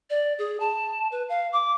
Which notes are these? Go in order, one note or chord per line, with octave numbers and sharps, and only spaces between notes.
D5
G#4
A5
B4
F5
D6